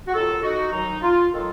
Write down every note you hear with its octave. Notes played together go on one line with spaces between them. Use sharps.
F#4
D#2 D#3 F#3 F4 A4
D#4 F#4
D#2 D#3 F#3 D#4
F4
D#3 F#3 F4 A4